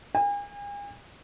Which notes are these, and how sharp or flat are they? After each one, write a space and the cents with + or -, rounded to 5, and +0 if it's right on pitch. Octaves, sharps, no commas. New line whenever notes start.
G#5 -40